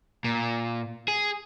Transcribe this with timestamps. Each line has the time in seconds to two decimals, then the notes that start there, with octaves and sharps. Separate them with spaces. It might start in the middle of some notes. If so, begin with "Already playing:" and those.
0.24 A#2
1.08 G#4